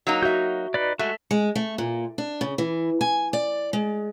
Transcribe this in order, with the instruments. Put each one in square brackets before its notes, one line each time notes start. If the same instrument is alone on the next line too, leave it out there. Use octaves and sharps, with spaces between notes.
[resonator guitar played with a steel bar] F#3 A#3 D#4
[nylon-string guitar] F#4 E5 [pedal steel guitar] G6
[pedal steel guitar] D#4 B4 D5
[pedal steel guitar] G#3 F#4 [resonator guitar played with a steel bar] A3
[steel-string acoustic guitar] G#3
A3
A#2
D4
C#3
E3
G#5
D5
G#3